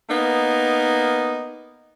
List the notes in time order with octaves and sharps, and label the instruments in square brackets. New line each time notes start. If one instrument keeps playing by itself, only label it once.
[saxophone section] A#3 B3 D#4